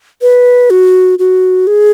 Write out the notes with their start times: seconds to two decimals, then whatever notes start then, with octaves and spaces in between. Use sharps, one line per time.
0.22 B4
0.70 F#4
1.19 F#4
1.67 G#4